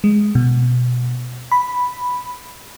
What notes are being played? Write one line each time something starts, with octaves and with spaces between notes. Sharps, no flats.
G#3
B2
B5